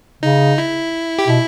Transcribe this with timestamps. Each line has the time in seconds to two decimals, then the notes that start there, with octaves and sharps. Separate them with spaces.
0.23 C#3 D#4
0.58 E4
1.19 G4
1.28 B2 E4